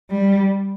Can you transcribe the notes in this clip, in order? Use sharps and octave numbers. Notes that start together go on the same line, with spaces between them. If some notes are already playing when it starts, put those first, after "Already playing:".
G3